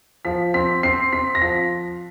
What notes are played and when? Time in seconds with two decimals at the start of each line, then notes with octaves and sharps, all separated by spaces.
0.25 F3 B6
0.54 C4 B6
0.83 C4 C7
1.13 C4 B6
1.35 A#6
1.42 F3 B6